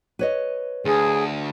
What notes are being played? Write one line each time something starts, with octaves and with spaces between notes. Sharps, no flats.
B4 C#5 D#5
D2 G#4